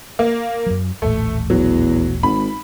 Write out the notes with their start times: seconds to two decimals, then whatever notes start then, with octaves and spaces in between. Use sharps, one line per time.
0.19 A#3
0.66 F#2 F#3
1.02 D#1 A1 A2 A3
1.50 E2 F#3
2.23 G#1 B5